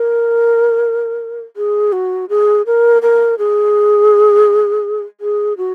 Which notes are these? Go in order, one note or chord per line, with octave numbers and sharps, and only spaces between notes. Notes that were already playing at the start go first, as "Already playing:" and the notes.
Already playing: A#4
G#4
F#4
G#4
A#4
A#4
G#4
G#4
F#4